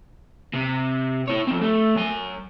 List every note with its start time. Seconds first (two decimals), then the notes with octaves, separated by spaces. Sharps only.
0.54 C3
1.28 E4 C#5
1.47 F2 C4
1.61 A3
1.95 F#3 G#5